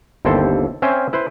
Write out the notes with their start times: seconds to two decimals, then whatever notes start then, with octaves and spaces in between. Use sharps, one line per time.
0.25 G1 D#2 C4 E4 A4 C5
0.82 C4 C#4 C5 E5 G5 G#5
1.13 E4 B4 C5